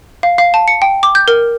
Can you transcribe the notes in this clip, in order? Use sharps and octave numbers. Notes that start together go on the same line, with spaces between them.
F5
F5
A5
C#7
G5
D6
G6
A#4